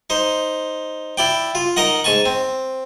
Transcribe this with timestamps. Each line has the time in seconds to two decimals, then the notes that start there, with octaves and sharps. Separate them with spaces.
0.10 D#4 C5
1.18 E4 D5 G5
1.55 F4
1.76 D#4 A#4 D#5 F#5
2.04 G#2 G#5 A5 C#6
2.25 C4